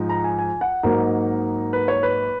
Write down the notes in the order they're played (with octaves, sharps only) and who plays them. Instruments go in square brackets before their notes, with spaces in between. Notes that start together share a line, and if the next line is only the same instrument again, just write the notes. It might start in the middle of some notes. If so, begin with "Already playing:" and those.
Already playing: [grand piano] G#2 F3 G#3 D#4
A#5
G#5
G#5
F#5
G#2 F#3 A#3 D#4 A#4
B4
C#5
B4